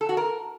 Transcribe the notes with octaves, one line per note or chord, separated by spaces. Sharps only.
A4
F#4
A#4